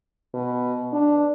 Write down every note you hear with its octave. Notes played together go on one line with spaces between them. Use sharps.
B2
D4